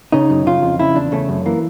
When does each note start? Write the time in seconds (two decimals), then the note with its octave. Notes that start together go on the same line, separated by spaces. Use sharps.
0.12 C#3 D#4
0.30 F#2
0.46 C#3 F4
0.62 F2
0.79 C#3 E4
0.95 E2 D4
1.12 C#3 A3
1.29 F#2
1.46 E3 A#3